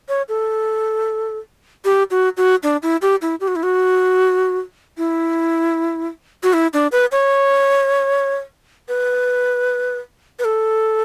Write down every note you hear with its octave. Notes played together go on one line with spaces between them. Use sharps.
C#5
A4
G4
F#4
F#4
D4
E4
G4
E4
G4
F#4
E4
F#4
E4
F#4
E4
D4
B4
C#5
B4
B4
A4